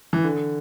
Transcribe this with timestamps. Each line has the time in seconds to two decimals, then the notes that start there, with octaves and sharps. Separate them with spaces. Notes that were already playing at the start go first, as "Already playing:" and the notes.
0.13 E3
0.24 D3